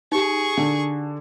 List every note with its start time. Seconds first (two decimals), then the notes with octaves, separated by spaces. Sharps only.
0.12 D#4 G4 G#4 C#6
0.57 D3 D4